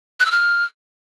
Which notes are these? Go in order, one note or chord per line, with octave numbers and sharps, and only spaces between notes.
F#6
E6
F6